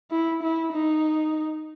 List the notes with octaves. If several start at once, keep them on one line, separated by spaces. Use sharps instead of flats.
E4
E4
D#4